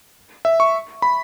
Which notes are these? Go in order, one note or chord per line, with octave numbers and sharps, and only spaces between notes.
E5
C#6
B5